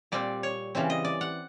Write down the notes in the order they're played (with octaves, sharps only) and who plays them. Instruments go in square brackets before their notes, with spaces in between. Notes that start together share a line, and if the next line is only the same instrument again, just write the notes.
[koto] A#2 G3 C4 D5
C#5
C#3 E3 G3 C4
D#5
D5
F#5